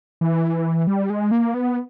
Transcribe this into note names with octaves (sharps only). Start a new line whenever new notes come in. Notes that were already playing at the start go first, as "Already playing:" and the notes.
E3
G3
G#3
A#3
B3